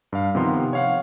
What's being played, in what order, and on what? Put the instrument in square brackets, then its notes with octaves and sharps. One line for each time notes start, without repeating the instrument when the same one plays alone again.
[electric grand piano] G2 F5
C3 D#3 F3 B3 A#4 C6
C#5 F5 F#5